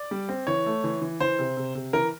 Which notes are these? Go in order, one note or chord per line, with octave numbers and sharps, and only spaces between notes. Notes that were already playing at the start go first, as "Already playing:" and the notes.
Already playing: D5
G3
C4
E3 C#5
A3
E3
E3
E3 C5
C3
C3
C3
E3 A#4